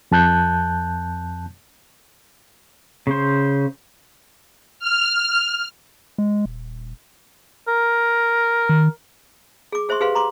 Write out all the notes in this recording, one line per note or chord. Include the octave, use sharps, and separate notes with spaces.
F2 A5 F#6 G6
C#3 C5
F6
G#3
D#1
A#4
D#3
G#4 D6
G#4 C5 E5 C6 C#6
G4 G#4 B4 F5 C6
A#5 C6 D6